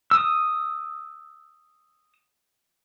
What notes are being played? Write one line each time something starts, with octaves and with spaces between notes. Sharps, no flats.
D#6 E6